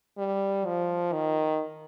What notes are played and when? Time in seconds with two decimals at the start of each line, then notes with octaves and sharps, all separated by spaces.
0.18 G3
0.65 F3
1.12 D#3